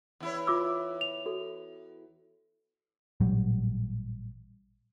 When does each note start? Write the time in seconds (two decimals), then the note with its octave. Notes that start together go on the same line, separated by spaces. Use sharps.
0.20 E2 E4 C#5
0.47 F4 D6 E6
1.01 F7
1.26 F#4 A4
3.20 A1 A#2 F#3 G3